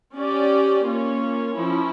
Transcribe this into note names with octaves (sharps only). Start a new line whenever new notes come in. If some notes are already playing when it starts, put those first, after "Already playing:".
C#4 G4 D5
A#3 C#4 F4 C#5
F3 C#4 E4